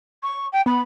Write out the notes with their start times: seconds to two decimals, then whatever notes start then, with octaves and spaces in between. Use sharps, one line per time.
0.23 C#6
0.52 G5
0.66 B3 B5